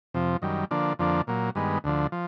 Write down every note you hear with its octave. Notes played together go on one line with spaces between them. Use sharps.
F2 C3 F3
F#2 D#3 G3
D3 F3 A#3 D4
F2 D3 F3 A#3 D4
A#2 F#3 A#3
G2 D#3 G#3 B3
D2 D3 F3
F3